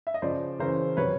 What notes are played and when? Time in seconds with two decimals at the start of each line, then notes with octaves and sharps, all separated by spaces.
0.07 E5
0.14 D#5
0.22 C#3 F3 C5 D5
0.59 C#3 E3 A#4 C5
0.97 C3 D#3 F#3 B4 C#5